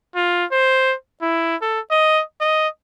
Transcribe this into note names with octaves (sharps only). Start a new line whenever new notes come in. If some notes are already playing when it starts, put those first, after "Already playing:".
F4
C5
E4
A4
D#5
D#5